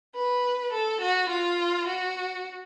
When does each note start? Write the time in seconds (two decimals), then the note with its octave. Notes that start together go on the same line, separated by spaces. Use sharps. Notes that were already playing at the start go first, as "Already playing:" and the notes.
0.16 B4
0.73 A4
1.02 F#4
1.30 F4
1.88 F#4